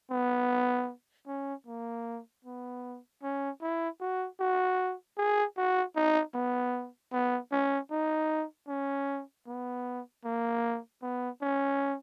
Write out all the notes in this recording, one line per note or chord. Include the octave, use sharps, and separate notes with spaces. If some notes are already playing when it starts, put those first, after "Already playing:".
B3
C#4
A#3
B3
C#4
E4
F#4
F#4
G#4
F#4
D#4
B3
B3
C#4
D#4
C#4
B3
A#3
B3
C#4